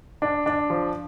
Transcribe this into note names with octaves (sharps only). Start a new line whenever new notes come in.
D4
D4
F3